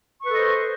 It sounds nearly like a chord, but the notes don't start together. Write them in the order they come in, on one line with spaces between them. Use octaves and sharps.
C#6 B4 A4 D#5 C5